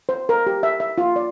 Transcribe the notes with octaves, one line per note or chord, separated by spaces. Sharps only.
C5
A#4
G4
E5
E5
F4
D5